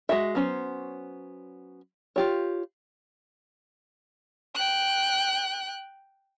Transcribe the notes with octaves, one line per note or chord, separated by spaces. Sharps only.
G#3 F#4 E5
F#3 B3 C#4 C5
F4 G4 C#5
G5 F#6